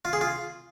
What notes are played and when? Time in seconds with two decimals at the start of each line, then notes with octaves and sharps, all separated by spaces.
0.05 F4
0.13 G#4
0.21 F4